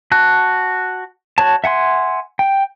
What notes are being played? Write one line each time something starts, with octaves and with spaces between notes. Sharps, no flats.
F#4 A5 F#6
F#4 C#5 A5
E5 F#5 G#5 C6
G5